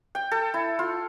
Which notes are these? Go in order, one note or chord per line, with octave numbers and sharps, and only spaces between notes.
G5
A4
E4
F4